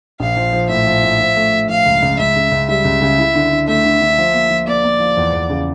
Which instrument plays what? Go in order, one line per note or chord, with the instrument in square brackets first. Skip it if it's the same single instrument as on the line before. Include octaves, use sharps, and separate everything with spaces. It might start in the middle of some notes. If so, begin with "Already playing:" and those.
[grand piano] A#1 [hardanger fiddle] F5
[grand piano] F3
F3
[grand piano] A2 [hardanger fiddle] E5
[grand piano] F3
A2
F3
A3
A3
[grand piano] F3 [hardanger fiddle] F5
[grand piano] C#2
C#2
[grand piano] C#2 [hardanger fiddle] E5
[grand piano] C#3
C#2
[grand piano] G3 [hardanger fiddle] E5
[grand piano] C#2
C#3
E4
D3
D3
[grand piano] A3 [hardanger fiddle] E5
[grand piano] D3
D3
F3
A#3
F3
[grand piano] A#3 [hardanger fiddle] D5
[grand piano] A#3
F3
E2
E2
C#3